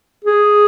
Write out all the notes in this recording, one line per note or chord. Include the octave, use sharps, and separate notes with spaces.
G#4